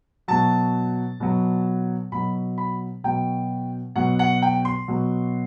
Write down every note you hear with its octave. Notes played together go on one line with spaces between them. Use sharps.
B2 F#3 A5
B2 F#3
B2 F#3 B5
B5
B2 F#3 G5
B2 F#3 F#5
F#5
G5
C6
B2 F#3